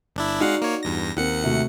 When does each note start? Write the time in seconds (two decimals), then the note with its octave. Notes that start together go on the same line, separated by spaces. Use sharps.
0.16 G1 D4 E4
0.40 G#3 D#4 F#4 D5 F5 F#5
0.62 A#3 C#5
0.83 E2 G2 A#6
1.16 D#2 C4 A#4 F#5 C#7
1.43 C3 A3 F#4